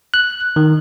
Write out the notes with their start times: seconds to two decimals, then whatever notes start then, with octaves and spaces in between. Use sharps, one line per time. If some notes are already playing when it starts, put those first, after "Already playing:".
0.14 F#6
0.56 D#3